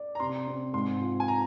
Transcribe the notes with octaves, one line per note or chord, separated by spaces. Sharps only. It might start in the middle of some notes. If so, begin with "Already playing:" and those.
Already playing: D5
A#5
C3 C6
C4
G#2 C6
F4
G#5
A#5